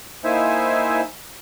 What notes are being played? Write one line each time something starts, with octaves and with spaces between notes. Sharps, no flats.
A#3 D#4 E4 C5 E5 G#5